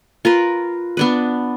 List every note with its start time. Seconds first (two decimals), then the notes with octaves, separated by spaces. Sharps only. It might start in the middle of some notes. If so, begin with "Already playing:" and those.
0.25 F4 A#4 B4
0.97 B3 D4 B4